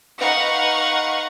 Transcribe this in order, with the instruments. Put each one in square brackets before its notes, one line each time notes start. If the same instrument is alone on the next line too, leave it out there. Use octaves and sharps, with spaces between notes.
[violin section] D#4 B4 F5 F#5 A#5 C#6